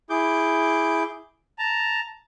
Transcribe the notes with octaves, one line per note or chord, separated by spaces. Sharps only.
E4 G#4 D6 G6
A5 A#5